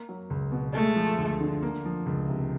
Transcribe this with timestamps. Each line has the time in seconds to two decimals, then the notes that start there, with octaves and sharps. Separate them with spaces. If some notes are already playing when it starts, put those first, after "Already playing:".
Already playing: A#3
0.09 F#3
0.30 C#2
0.52 B2
0.74 G#3 A3
0.96 F3
1.18 D2
1.40 D3
1.62 A#3
1.85 F3
2.06 C#2
2.29 C3